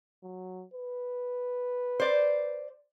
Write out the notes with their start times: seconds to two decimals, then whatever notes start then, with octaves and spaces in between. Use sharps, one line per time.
0.23 F#3
0.74 B4
2.00 C5 D5